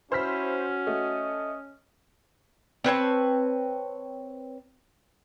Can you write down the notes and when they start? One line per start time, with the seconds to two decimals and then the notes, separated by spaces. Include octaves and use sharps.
0.12 C#4 E4 F#4 C5 F6 B6
0.87 A3 D#5
2.84 C4 B4 C#5 A5